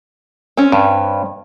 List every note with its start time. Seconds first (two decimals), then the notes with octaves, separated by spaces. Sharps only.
0.57 C4 C#4
0.72 G2